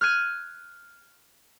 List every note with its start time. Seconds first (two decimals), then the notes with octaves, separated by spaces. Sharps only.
0.01 F6 F#6 G#6 D#7